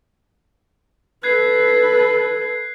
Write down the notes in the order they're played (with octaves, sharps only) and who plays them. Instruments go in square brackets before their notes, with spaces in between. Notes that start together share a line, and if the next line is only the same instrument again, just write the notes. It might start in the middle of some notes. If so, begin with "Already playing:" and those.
[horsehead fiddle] A4 B4 [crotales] F#6 G#6 C7